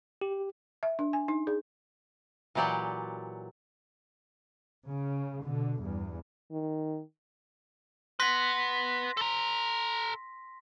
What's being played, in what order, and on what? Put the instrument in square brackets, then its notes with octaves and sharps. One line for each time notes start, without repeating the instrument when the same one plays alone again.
[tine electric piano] G4
[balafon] E5
D4
G#5
D#4
G#4
[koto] A#2 E3 F#3 G4 D5 F#5
[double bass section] C#3
B2 D3
E2 G2
[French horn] D#3
[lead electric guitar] B4 F#5 [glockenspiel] C6 A#6 B6
[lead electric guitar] A4 A#5